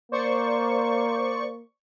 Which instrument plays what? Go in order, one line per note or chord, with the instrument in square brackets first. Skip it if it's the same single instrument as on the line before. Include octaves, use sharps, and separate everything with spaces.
[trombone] A#3 [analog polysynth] C5 D5 C#6